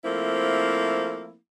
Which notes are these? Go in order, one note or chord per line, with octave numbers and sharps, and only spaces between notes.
F3 A3 A#3 C4 E4